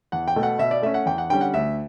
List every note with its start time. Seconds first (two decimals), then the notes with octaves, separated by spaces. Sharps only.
0.12 E2 F#5
0.28 G5
0.36 B2 A3
0.43 F#5
0.59 B2 E5
0.71 D5
0.82 A3 C#4 E5
0.94 F#5
1.06 E2 G5
1.18 F#5
1.30 D3 G3 C#4 G5
1.41 F#5
1.54 D2 E5